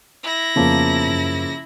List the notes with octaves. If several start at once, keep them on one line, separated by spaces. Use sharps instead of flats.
E4 A#6
F2 C#3 F3 A#3 B3
F#2